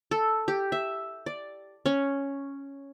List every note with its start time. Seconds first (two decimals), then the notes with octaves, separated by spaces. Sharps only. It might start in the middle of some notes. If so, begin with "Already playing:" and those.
0.11 A4
0.48 G4
0.72 E5
1.26 D5
1.86 C#4